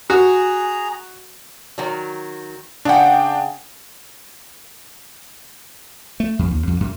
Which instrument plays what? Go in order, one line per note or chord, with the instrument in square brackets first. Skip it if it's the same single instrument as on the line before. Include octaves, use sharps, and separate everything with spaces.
[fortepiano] F#4 [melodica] G#4 A#5
[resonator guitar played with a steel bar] D#3 F#3
[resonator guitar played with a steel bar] C#3 F#5 [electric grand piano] D4 G5
[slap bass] A3
F2
D#2
F2
F#2